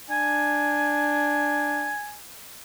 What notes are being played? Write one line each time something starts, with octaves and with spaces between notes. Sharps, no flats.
D4 G#5